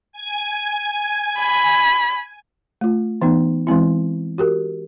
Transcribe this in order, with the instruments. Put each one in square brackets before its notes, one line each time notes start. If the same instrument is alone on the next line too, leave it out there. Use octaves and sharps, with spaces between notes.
[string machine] G#5 G#6
[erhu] B5
[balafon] A3 F4
E3 B3 D#4
E3 G#3 C4 E4
F#4 G4 A#4